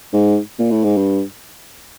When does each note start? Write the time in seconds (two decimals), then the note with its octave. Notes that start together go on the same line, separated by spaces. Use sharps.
0.13 G#2
0.59 A#2
0.71 A2
0.84 G#2
0.97 G2